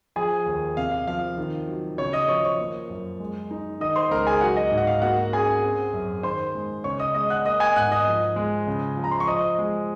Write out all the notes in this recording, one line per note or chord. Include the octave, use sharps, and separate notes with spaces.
F3 G#4 G#5
D#2
C3 F5
F5
F3 F5
D#3
F#3
C#3 C#5 C#6
D#5 D#6
F3 C#5 C#6
C#5 C#6
A#3
F#2
G#3
D#4
D#3 D#5 D#6
C5 C6
C#2 A#4 A#5
G#4 G#5
F#3 F#4 F#5
D#5
G#2
F#5
F5
A#3 F#4 F#5
C#4 G#4 G#5
C4
F#2
D#3 C5 C6
G#3
C#3 C#5 C#6
D#5 D#6
G#3 D#5 D#6
F#5 F#6
A#3 D#5 D#6
G#5 G#6
G#2 F#5 F#6
D#5 D#6
F3
G#3
C#3
F3
A#5
C6
C#6
F3 D#5 D#6
G#3